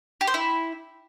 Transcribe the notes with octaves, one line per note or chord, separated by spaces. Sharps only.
G4
C5
E4